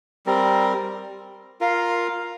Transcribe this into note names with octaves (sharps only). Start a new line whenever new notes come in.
G3 C4 A#4
F4 A#4 F5